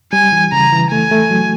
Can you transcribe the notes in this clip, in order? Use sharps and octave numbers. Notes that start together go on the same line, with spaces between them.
G3 G#5
E3
C#3 A#5
E3
A3 G#5
A3
F#3